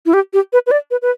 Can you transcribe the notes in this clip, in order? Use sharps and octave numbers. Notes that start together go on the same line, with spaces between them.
E4
G4
G4
B4
B4
D5
B4
B4